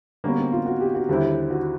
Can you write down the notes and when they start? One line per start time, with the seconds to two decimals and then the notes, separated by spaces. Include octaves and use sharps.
0.24 D3 G3 A#3 B3 C#4 F#4
0.38 C4
0.52 F4
0.66 F#4
0.80 G4
0.95 F#4
1.08 D#2 D3 G3 C4 E4 G4
1.50 F#4